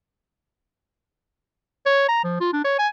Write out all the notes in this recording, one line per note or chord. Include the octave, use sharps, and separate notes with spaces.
C#5
A#5
F3
F4
D4
C#5
G#5